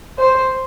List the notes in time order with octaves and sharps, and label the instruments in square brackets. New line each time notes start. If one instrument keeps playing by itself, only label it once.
[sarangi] C5